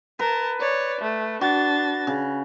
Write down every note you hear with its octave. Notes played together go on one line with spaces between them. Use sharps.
A#4 B4 A5
C#5 D5
A3
D4 F#4 A6
C#3